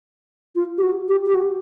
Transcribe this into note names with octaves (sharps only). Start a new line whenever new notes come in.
F4
G4
F#4
G4
G4
F#4